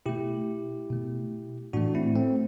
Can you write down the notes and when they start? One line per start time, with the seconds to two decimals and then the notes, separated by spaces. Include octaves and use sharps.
0.06 B2 A3 E4 G4
0.90 B2 A3
1.73 A2 E3 A3 D4 F#4
1.95 C4 E4
2.16 A3 C4